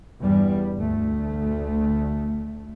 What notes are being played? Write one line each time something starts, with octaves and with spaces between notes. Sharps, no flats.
E2 G2 G3
D2 A3